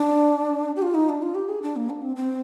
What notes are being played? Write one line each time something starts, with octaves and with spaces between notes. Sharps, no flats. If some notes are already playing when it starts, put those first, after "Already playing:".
Already playing: D4
G4
F4
D#4
D4
F4
G4
G#4
D4
A#3
D4
C4
C4